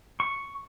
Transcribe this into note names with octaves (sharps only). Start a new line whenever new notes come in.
C#6